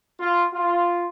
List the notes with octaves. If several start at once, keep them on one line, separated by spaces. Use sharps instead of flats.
F4
F4